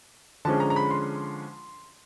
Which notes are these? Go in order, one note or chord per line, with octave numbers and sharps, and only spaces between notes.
D3 F3 G#3 C#4 A5
A#5
A#5
B5
C6